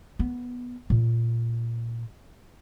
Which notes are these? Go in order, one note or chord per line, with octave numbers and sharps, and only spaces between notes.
B3
A#2